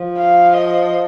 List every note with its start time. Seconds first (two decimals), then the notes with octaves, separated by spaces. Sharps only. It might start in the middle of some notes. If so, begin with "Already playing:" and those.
Already playing: F3
0.17 F5
0.54 D#5